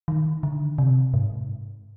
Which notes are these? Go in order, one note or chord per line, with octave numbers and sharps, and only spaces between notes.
D#3
D3
C3
G#2